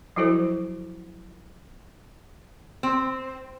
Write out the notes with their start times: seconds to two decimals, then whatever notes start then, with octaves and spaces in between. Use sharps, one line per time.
0.16 F3 F#3 E4 F#4 A4 C5
2.83 C4